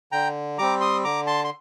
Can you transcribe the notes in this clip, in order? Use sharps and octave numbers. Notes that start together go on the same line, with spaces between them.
D3 G5 A#5
G3 C4 A#5 D6
C6 D#6
D3 A#5 D6
A5 C6
C6